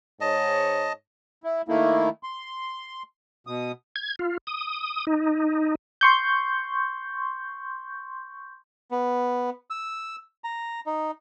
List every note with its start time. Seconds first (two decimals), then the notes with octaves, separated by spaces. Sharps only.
0.21 G#2 C#5 D#5 A5
1.44 E4
1.68 D#3 A3 A#3 E4
2.23 C6
3.47 B2 D#6
3.96 G#6
4.19 F4
4.47 D#6
5.07 D#4
6.01 C6 C#6 G6
8.91 B3
9.70 E6
10.44 A#5
10.86 D#4